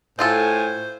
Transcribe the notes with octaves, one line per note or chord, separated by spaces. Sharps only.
A2 A3 F4 A4 C5 G#5